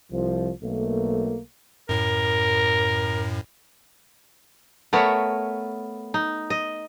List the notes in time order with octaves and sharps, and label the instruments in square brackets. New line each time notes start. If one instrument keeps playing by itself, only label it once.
[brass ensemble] C2 F3
B1 A3 A#3
[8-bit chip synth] F#2 A2 [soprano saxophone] A#4
[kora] A3 B3 A#4 C#5
D#4
D#5